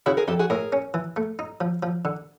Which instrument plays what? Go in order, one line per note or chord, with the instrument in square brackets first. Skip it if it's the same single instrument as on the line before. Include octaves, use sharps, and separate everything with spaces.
[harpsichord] C#3 [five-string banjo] E4 F#4
[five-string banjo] G#4 A#4
[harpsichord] F2 [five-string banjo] G4 A4
[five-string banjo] F#4 G#4
[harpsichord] A2 [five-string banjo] G#4 A#4
[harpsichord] C#4
E3
A3
D#4
F3
F3
D3